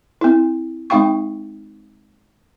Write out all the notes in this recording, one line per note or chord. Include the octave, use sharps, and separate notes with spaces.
C4 E4
G#3 C4 D#4 F5 G5 C#6